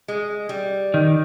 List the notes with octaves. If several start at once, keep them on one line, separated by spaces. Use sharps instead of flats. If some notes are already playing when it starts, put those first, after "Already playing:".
G#3
G3
D#3